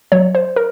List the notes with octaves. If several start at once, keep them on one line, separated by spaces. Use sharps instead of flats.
F#3 C#5
C5
A#4